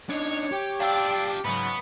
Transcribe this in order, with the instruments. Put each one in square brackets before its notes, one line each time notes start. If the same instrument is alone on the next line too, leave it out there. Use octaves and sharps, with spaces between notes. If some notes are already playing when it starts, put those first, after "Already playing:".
[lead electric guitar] D4 D#4 [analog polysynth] C#5
[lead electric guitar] G4
[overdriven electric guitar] D4 F4 [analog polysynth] D5 [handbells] F5 G5 E6
[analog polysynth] G#2 C#3 F#3 [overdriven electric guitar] B3 [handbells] B5